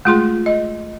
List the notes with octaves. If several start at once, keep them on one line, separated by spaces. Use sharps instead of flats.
G#3 A3 F4 G#4 C6
D#5